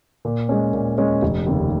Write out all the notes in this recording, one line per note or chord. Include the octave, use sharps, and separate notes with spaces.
A#2
G#3 C#4
A#2
G#3 C#4
F1
D#2 C#3